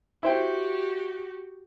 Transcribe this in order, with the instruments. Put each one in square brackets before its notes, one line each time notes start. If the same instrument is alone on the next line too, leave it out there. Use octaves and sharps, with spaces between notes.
[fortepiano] E4 C5 G5 [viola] F#4 G4